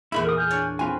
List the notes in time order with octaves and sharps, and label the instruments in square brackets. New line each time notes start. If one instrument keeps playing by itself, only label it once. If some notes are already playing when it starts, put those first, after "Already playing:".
[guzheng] E2 A#2 G#4 [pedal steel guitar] E4 B5
[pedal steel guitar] A#4 D#6
G#5 F6 G6
[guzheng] D4 C#5 D5
[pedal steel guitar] C4 F4 G#5 [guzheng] B4